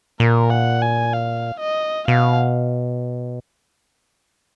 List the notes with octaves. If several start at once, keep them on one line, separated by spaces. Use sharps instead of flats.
A#2 A#4
F#5
G#5
F5
D#5
B2 F5